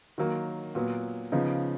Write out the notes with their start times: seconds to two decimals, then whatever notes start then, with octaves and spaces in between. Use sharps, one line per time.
0.18 D#3 F#3 A#3
0.75 A#2 F#3 B3
1.32 C#3 F3 B3 D#4